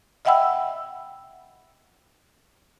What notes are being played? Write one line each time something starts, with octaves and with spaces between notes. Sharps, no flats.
D#5 E5 F#5 G5 B5 E6